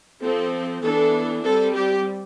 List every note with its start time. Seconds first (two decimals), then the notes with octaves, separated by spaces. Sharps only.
0.22 F3 C4 A4
0.82 E3 B3 D4 A4
1.44 G3 C4 A4
1.74 G4